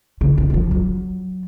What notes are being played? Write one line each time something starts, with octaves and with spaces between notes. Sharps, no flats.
C#3
D#3
F#3
F3
F#3